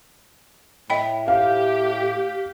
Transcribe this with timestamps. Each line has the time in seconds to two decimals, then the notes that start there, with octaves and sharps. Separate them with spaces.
0.90 A2 D#5 G5 B5
1.28 G4 F5